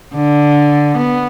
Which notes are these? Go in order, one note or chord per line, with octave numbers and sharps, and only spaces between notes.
D3
B3